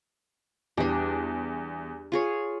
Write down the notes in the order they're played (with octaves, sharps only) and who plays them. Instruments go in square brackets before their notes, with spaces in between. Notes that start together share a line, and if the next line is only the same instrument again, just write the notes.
[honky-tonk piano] E2 [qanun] G3 D4
[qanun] F4 G#4 C#5